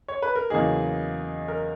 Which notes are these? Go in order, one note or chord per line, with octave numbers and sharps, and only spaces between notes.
C#5
B4
A#4
E2 C#3 F#3 A#3 D#4 G#4
A#4